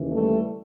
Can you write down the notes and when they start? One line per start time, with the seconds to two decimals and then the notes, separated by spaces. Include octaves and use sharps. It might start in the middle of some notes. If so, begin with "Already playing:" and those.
Already playing: D#2 C#3 E3
0.13 G3 A3